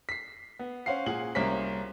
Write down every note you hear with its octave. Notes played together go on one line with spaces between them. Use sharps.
B6 C7
B3
C#4 C5 F5 F#5 C7
A#2 G#4 F#5 F#7
C2 A#3 C#4 C5 B6